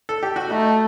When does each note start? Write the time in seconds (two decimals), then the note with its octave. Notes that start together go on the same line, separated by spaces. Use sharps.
0.09 A4
0.23 G4
0.36 F#4
0.50 A3 D#4